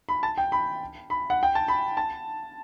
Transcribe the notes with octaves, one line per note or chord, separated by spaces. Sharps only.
B5
A5
G5
B5
B5
F#5
G5
A5
B5
A5